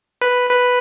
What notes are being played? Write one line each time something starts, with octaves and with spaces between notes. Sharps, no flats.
B4
B4